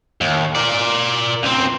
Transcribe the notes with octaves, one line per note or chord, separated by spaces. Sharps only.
D#2
A#4 D5
C#2 C4